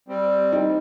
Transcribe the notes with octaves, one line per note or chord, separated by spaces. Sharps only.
G3 C4
D#4